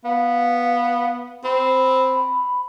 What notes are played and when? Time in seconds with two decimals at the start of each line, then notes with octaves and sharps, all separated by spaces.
0.04 B3 F5
1.44 C4 B5